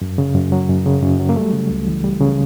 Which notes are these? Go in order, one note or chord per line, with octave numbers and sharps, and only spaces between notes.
F#2
C#3
F#2
F#3
F#2
C#3
F#2
F#3
A#3
G3 A3
C#3
C#2
E3
G3
C#3